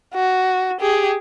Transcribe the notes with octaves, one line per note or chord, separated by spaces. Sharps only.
F#4
G4 G#4